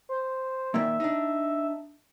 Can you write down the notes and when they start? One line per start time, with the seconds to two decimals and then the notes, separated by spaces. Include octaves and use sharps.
0.09 C5
0.74 A#2 D#3 A#3 E5
1.00 D4 D#4